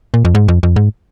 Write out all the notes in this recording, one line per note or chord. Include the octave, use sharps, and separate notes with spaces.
A#2
F2
G#2
F2
F2
G#2